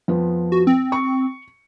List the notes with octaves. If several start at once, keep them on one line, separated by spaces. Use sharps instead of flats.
F2 F3 B3
F#4
C4
C#6